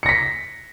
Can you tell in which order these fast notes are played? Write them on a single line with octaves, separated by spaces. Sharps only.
C#7 A#6 B6